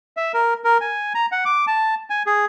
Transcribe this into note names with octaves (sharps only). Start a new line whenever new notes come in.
E5
A#4
A#4
G#5
A#5
F#5
D6
A5
G#5
G#4